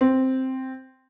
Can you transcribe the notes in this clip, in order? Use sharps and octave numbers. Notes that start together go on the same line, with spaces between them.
C4